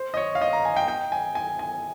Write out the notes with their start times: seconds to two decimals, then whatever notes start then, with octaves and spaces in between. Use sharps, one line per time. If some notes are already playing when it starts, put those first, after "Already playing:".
Already playing: C5
0.14 D#5
0.17 C#5
0.35 F5
0.41 D#5
0.53 A#5
0.65 G#5
0.76 G5
0.88 G5
1.12 G#5
1.35 G#5
1.59 G#5